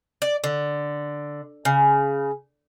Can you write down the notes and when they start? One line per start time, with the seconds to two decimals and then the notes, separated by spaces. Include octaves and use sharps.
0.22 D5
0.44 D3
1.65 C#3